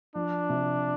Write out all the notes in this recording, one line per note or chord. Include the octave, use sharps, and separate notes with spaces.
F3 D4
C3